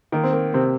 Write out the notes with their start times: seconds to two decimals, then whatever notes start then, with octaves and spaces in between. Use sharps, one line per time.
0.12 D#3 A#3
0.24 C4
0.33 A#3
0.54 C3 C4